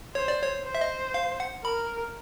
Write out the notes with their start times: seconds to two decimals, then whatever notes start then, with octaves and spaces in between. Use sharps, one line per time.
0.15 C5 C#5
0.28 D5
0.43 C#5
0.65 C5
0.75 E5
0.81 D#5
1.14 F5
1.40 F#5
1.64 A#4 B5